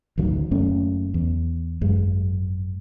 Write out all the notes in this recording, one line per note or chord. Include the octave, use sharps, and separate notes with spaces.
A1 D2 D#3 F#3
F#1 F#2 A3 C#4
E2
G#1 F#2 G#3